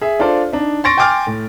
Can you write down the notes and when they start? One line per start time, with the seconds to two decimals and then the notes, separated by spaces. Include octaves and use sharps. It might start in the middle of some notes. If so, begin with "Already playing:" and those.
0.01 G#4 E5
0.19 D4 F4 A4 C5 D5
0.53 D4 D#4
0.84 C6 C#6 A6 A#6 D7
0.97 G5 G#5 C6 D6 F6 A6
1.27 A2